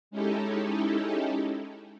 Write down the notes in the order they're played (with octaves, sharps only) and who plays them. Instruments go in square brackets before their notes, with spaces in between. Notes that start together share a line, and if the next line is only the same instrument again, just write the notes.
[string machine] G#3 C#4 D#4 E4 G4 A4